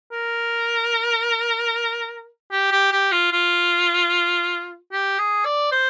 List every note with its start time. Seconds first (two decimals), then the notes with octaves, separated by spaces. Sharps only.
0.12 A#4
2.52 G4
2.72 G4
2.92 G4
3.12 F4
3.32 F4
4.92 G4
5.19 G#4
5.45 D5
5.72 C5